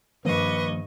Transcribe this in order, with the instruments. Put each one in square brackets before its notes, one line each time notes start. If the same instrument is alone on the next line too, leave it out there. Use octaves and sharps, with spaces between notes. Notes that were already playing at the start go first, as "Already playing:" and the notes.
[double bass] G2 [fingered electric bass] D#3 F3 A#3 [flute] B4 [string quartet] D#5 C#6